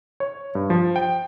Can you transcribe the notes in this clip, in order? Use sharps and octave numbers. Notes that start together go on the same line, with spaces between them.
C#5
G2
F3
G5